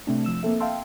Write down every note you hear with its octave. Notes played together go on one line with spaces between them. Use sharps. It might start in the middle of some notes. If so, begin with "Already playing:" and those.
C3 A3 C4 D4
F3 E6 E7
A#3 C4 A4 E5
E5 F5 G5 A5 C6 E6